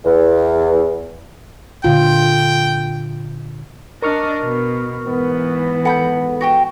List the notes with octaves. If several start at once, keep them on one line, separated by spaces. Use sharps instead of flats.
E2
A#2 D3 F4 G5
D4 A#4 D#5 C#6 F6
B2
G#2 E3 B3
A4 F#5 B5 G6
F#4 G4 G5